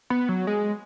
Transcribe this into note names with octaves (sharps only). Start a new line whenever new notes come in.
B3
F#3
G#3